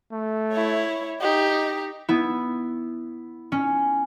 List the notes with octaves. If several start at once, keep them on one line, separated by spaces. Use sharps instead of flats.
A3
E4 C#5
D#4 G4 D#5
B3 E4
C#4